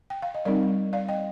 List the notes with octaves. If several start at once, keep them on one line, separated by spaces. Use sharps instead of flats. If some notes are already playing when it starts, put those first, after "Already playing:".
G5
F5
D#5
G3 C4 D#4 A#4 D5
D5 F5
D#5 G5